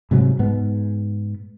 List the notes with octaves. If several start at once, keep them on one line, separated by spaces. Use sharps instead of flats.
G#2 C3 F#3
G#2 B3